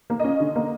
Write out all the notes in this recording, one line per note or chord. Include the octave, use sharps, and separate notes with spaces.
A#3
C#4 D#5
D3
A#3